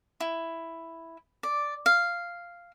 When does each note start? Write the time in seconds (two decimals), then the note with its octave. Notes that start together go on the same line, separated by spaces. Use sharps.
0.20 E4
1.43 D5
1.86 F5